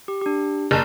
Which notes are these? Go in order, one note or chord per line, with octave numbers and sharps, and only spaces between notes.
G4
D4 G4
F#1 D5 A5 A#5